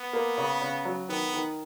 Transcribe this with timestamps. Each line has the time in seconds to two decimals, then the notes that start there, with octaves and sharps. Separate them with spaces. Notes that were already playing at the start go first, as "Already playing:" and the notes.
Already playing: B3
0.13 A#3
0.38 C#3
0.61 C#3
0.85 F#3
1.09 D#3 B3
1.34 D#3